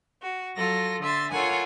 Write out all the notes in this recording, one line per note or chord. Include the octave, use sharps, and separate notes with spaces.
F#4
F#3 F4 A4 A#6
D3 E5 C6 A6
F4 A4 A#4 C#5 F#5 G#5